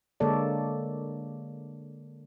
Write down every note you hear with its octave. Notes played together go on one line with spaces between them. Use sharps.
D3 G#3 A#3 A4 C#5 D5